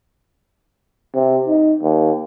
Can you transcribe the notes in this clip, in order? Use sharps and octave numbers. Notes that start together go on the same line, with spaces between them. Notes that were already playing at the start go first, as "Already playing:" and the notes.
C3
D#4
D#2